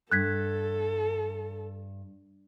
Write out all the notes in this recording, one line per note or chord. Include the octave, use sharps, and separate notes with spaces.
G2 A4 F#6 G#6 B6